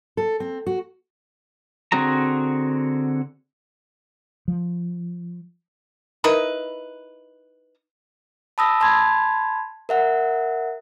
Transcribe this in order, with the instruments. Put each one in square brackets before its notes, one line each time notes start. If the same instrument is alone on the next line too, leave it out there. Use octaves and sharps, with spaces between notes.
[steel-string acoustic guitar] A4
C4
F#4
[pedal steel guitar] D3 C4 F#4 G#4 A#5
[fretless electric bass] F3
[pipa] D#4 E4 A#4 B4
[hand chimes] A5 B5 D#6 E6 A#6
A5 B5 C6 G#6
A#4 E5 F#5